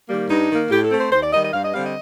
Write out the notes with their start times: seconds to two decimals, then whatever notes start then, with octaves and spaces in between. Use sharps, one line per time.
0.09 D#3 G3 A#3
0.30 G2 D#4
0.50 D#3 A#3
0.71 A2 G4
0.85 A4
0.91 A3 C4
0.99 C5
1.12 D#2 C5
1.23 D5
1.33 D#3 G3 D#5
1.43 D#5
1.53 G2 F5
1.64 D#5
1.74 D3 G3 C4 F5
1.85 D#5